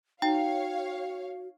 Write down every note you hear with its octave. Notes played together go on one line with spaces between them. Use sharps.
D#4 F#4 C#5 F5 G5